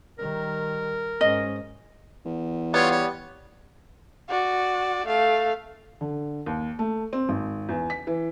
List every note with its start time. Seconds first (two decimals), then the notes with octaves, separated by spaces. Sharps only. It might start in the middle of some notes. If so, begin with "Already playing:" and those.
0.19 D#3 G3 A#4
1.21 G#2 C#4 D#5
2.25 E2
2.74 G3 B3 F4 C#5
2.91 C#5
4.29 F#4 D5
5.06 A3 F5
6.01 D3
6.46 D#2
6.79 A3
7.13 C4
7.29 G#1
7.69 E2
7.90 B6
8.07 E3